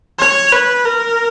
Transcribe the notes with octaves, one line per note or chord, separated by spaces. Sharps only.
C#5
B4
A#4